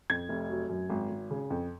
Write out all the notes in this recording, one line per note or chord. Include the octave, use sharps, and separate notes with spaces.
F2 G#6
F1
F#3
F#2
G#1
G#1
C#3
F2